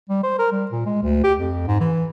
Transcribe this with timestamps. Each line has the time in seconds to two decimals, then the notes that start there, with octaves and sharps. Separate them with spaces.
0.09 G3
0.23 C5
0.39 A#4
0.52 G3
0.71 A#2
0.86 G#3
1.02 D2
1.24 G4
1.39 F2
1.67 G#2
1.80 E3